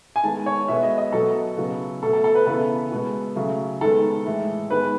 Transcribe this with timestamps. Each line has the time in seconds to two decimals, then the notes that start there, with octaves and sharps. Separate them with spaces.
0.16 G#5
0.23 D#3 G#3 B3 A5
0.46 C#5
0.68 B2 G#3 B3 E5
0.83 D#5
0.98 D#5
1.13 B2 F#3 B3 A4
1.57 C#3 F#3 B3
2.03 B2 A3 A4
2.13 A4
2.24 A4
2.35 B4
2.46 C#3 E3 B3 A4
2.91 B2 G#3 B3
3.36 C#3 F#3 A3
3.81 D#3 G#3 B3 A4
4.25 A2 E3 G#3
4.70 D#3 G#3 B3 B4